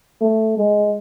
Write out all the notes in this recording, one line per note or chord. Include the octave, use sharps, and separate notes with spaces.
A3
G#3